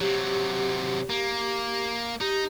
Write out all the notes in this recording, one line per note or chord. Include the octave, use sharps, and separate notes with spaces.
C3 F#3 G4
A#3
D#4 G4